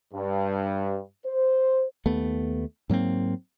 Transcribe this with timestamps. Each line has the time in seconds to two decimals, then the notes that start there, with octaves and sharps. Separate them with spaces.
0.14 G2
1.25 C5
2.06 D#2 A3 B3
2.90 G#2 F#3 A#3 C4